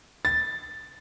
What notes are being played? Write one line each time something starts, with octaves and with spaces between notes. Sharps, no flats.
A6